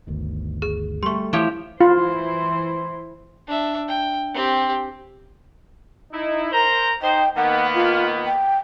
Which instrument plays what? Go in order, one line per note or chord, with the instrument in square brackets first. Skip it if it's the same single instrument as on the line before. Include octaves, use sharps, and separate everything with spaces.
[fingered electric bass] G1 D2 D#3
[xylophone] G#4
[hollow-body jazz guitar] G3 A3 [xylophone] C6 C#6
[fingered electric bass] E3 A3 [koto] F3 G4 C#5 [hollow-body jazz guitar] E4
[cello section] E3 E4 C5 [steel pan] F4
[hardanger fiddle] D4 E5
G5
C4 G4
[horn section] D#4 E4
A#4 C5 A#5
[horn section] D#4 C5 [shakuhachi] G5
[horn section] D#3 A#3 B3 [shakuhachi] F#5
[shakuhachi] F4
G5